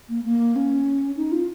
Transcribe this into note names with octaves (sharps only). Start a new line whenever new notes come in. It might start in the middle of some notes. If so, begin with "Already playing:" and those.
A#3
A#3
C#4
D#4
F4